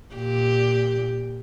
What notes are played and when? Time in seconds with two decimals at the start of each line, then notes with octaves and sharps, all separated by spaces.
0.15 A#2 G4